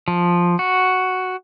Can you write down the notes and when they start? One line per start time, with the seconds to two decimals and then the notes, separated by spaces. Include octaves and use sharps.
0.08 F3
0.59 F#4